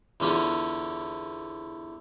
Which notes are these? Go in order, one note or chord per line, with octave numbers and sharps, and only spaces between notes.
E2 D3 C#4 F4